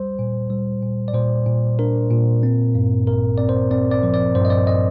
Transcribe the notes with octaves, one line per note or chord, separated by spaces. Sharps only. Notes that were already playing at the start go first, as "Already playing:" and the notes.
Already playing: G3 C5
A#2
G3
A#2
D5
A#2 C5
A#2
D4 A#4
A#2
C4
G2
A1 A#4
C4 D5
C5
C4 D5
D5
F3
D5
G2 C5
D#5
D5
D#5